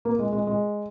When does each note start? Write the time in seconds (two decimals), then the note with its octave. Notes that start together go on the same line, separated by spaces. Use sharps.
0.05 A#3
0.19 G#3
0.32 G#3
0.47 G#3